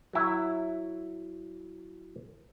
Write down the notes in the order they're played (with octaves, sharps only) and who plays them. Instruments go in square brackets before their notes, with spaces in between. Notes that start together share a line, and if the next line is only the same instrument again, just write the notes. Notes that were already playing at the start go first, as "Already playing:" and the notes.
[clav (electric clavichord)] F#3 E4